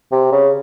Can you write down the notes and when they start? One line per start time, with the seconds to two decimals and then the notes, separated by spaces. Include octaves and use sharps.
0.12 C3
0.32 C#3